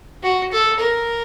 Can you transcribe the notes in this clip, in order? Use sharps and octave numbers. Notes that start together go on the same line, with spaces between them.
F#4
A4
A#4